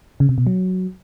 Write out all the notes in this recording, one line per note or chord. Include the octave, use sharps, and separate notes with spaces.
C#3
C3
B2
F#3